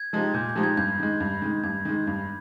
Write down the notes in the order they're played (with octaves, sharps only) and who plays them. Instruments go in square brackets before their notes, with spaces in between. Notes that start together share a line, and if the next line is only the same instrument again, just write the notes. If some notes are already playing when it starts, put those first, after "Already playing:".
Already playing: [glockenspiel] G#6
[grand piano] F3 G#3 D#4 G4
[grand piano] A#2 [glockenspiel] G6
[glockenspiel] G6
[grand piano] F3 G#3 D#4 G4
[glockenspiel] G#6
[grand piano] G2 [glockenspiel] G6
[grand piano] D#3 G#3
G2
D#3 G#3
[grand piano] G2 [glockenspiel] G#6
[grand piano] D#3 G#3
G2